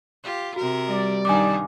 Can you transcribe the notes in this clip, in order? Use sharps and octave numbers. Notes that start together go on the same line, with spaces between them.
F4 G4
C3 F#4 A#4
G3 D5
G2 D#3 D#4 G#5 D6